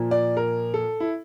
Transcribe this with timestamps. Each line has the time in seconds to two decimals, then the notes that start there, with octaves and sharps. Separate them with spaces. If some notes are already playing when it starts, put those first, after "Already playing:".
Already playing: A#2 F3 A#3
0.11 D5
0.37 A#4
0.74 A4
1.00 E4